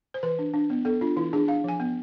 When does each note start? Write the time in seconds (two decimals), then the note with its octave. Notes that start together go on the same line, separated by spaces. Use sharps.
0.14 C5
0.23 E3 B4
0.39 D4
0.54 D4
0.70 B3
0.85 B3 A4
1.01 D4 F4
1.17 E3 E4
1.33 D4 G#4
1.48 D4 F5
1.64 F3 G#5
1.80 B3